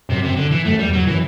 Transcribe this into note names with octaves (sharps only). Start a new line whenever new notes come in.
F#2 C3
C3
D3
E3
F#2 A3
E2 G3
F#3
F#2
E3